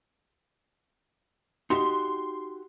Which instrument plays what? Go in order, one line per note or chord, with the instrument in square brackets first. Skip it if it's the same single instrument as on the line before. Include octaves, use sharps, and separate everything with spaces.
[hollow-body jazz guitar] D#4 F#4 G4 [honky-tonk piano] C6